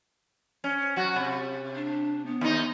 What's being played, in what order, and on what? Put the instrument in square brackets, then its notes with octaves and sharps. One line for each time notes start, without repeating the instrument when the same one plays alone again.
[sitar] C#4
F#3 F#4
C3
[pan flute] D4
B3
[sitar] D#2 D#4